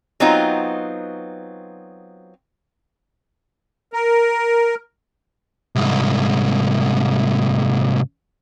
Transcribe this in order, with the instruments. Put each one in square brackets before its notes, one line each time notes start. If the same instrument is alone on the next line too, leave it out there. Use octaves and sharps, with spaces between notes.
[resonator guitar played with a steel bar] F#3 B3 C4 D#4 F4
[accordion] A#4
[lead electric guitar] C2 G#2